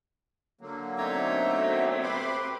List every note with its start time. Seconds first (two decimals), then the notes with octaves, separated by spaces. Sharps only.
0.61 D3 F#3 A#3
0.98 B2 A3 C4 D#4 C#5 E5 A#5
2.03 G4 B4 B5 C6 D6